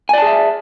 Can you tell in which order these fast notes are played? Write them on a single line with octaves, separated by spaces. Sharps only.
G#5 D5 A5 G#4 E5